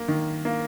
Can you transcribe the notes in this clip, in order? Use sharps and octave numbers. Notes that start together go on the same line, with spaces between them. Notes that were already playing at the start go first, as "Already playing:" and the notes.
Already playing: A#3
D#3
A#3